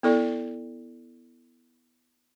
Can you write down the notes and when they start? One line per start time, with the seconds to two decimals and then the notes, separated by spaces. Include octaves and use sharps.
0.03 B3 E4 A4 D5